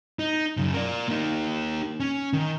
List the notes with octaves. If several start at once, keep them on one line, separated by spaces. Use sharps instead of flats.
D#4
F#2 C#3
A#4 D5
A#3 D#4
C#4
D#3